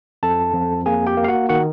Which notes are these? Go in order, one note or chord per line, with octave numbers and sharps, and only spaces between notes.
F2 A4 A5
F2
A#3 G#4 G#5
G4 G5
A#3
F5
F#4 F#5
D#3 F#4 F#5